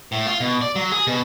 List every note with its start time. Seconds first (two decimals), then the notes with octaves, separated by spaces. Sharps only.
0.12 A2
0.26 F4
0.40 B2
0.61 D5
0.76 F#3
0.92 G#4
1.07 B2